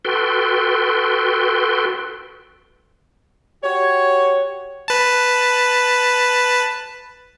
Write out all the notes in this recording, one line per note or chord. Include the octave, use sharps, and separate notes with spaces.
F#4 A4 B4 G5 C6
F#4 G4 C#5
B4 A5